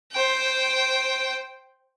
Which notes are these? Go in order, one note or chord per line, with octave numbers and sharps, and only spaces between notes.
C5 G5